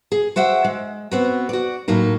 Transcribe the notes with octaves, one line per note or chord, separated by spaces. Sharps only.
G#4
F#4 C5 E5 F#5 G5
G#3
B3 C4 F#4
F#4 D5
A2 F#3 A#3 D#4